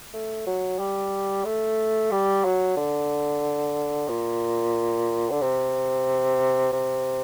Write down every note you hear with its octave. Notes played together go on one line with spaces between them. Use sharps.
A3
F#3
G3
A3
G3
F#3
D3
A#2
D3
C3
C3